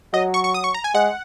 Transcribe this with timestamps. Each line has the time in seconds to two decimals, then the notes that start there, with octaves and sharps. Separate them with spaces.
0.13 F#3 D#5
0.34 C#6
0.44 C#6
0.54 D#6
0.64 C#6
0.74 A#5
0.84 G#5
0.95 G#3 F#5